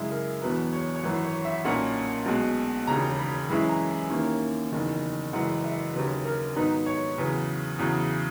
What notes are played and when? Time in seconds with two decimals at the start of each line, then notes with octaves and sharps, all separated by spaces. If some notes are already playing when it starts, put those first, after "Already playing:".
Already playing: F#2 C#3 G#3 E4
0.11 A#4
0.42 E1 E2 B2 F#3 B4
0.73 C#5
0.96 C#5
1.03 G#1 F#2 E3 B4
1.24 C#5
1.45 E5
1.65 B1 A#2 A#3 C#4 F#5
2.26 B1 B2 G#3
2.87 E1 D#2 C#3 A#5
3.19 B5
3.49 F#2 E3 G#3 C#4 E4 B5
3.69 A#5
3.90 G#5
4.10 D#2 D#3 A#3 C#4 E4
4.72 F#1 E2 D#3
5.33 F#1 F#2 E3 G#3 F#5
5.64 E5
5.94 D#2 C#3 F#3 B4
6.25 A#4
6.56 G#2 D#3 F#3 B3 D#4 B4
6.86 C#5
7.18 E2 C#3 F#3 B4
7.79 E2 C#3 F#3